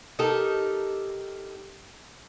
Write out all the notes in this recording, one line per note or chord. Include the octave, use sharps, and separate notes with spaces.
D#4 G4 A4 A#4